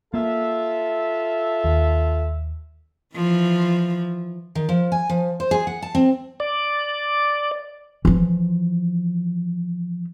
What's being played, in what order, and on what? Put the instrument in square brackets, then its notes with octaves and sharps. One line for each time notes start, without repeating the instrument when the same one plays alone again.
[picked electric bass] A#3 [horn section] F4 A4 E5
[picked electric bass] D#2
[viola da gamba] E3 F3
[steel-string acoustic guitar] D#3
F3
G#5
F3
C5
G#4
F#5
A5
C4
[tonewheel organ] D5
[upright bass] E3 F3